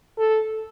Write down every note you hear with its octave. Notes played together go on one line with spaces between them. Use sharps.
A4